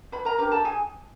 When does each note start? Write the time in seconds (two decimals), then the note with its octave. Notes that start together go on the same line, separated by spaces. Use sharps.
0.12 B4 B5
0.25 A#4 A#5
0.38 D4 G4 A#4 B4 A#5
0.52 A4 A5
0.65 G#4 G#5